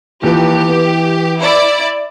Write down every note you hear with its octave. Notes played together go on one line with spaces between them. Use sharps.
D#2 E3 F3 G4 B4
B3
E4 D5